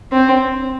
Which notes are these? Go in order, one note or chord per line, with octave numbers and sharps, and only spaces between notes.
C4